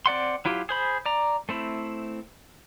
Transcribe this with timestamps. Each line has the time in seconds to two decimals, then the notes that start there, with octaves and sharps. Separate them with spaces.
0.06 C4 D5 F#5 C6
0.45 F#3 E4 F4 G4
0.69 G#4 C5 B5
1.06 D5 A#5
1.49 A3 C4 E4